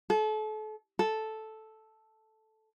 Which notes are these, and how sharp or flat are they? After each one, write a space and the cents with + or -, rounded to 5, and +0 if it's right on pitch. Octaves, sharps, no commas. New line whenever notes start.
A4 -35
A4 -5